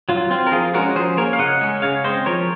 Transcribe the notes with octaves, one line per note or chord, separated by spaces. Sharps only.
F#3 F4
C4 F4
A#4
F3 F4 G#4
G#3 C#4 F#4 A#4
F3 G#4 C5
A#3 C#4 A#4 C#5
F5
C#3 D#5 F#5
G#3 C#4
C#3 C#5 F5
G#3 C4 C5 D#5
F3 A#4 C#5